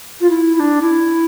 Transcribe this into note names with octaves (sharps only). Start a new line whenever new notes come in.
F4
E4
E4
D4
E4